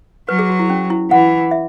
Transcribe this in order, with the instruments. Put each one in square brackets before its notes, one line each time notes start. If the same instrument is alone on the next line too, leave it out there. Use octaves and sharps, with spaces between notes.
[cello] F#3 [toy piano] B4
[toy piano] G#4
F#4
E4
C#4
E4
[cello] E3 [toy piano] F#5
[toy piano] E5